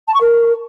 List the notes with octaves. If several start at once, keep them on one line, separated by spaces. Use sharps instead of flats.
A5
C#6
A#4